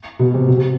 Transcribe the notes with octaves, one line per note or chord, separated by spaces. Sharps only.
B2
C3
B2
C3